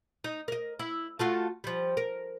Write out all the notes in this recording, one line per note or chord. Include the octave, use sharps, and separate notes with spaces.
D#4
A#4 D#5
E4
A3 F4 F#4
F3 G3
A#4